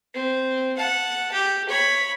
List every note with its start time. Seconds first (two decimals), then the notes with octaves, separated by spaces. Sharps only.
0.15 C4
0.77 F#5 A5
1.32 G4
1.69 C#5 B5